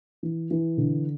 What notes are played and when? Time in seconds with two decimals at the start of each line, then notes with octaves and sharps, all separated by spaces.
0.23 E3
0.51 E3
0.78 D3